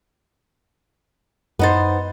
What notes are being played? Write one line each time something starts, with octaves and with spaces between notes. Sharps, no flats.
F#2 B3 D#4 C5 A6